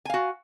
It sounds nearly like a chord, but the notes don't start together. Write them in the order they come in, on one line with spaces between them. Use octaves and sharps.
G#5 F5 F#4